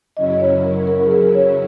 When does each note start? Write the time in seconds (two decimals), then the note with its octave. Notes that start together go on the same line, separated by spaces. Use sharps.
0.16 F#2 C#3 F#3 C#4 E4 D#5
0.40 C#5
0.64 A#4
0.87 A#4
1.06 G#4
1.11 A#4
1.35 C#5